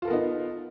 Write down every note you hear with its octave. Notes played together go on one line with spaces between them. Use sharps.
B3 D#4 F4 A4 A#4